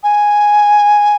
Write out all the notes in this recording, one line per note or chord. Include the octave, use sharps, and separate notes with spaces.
G#5